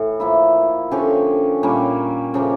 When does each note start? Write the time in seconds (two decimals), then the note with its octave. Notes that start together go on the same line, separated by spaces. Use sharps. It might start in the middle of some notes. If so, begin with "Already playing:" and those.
Already playing: A2 E3
0.20 F3 A#3 E4
0.91 D3 F3 C#4 G4
1.63 A#2 G3 A#3 C#4
2.34 C#3 F3 A#3